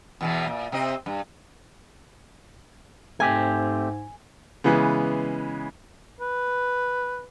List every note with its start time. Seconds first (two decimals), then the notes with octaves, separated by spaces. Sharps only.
0.21 E2 B2 E3
0.47 A#2
0.72 C3 C4 D#5
1.06 G2
3.20 G#2 A3 C4 G4 G#5
4.64 C#3 E3 G#3 B3
6.21 B4